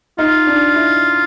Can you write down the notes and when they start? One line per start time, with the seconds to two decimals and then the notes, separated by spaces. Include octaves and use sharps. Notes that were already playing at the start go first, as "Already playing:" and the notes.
0.19 D#4 F4
0.47 D4
0.76 E4